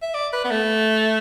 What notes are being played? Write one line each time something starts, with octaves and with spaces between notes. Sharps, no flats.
E5
D5
B4
B3
A3